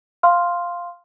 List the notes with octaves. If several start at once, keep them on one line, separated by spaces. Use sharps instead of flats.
F5 C6 F6